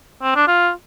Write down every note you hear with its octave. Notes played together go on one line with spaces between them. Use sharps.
C4
D4
F4